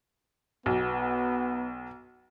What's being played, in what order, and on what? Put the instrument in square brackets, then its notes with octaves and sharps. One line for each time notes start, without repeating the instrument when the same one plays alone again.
[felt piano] B1 [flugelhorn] B3